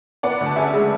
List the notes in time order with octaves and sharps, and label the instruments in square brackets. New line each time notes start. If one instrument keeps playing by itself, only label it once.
[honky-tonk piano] B3 D5 F#5
D2
A5
C#3 E5 G#5
G#3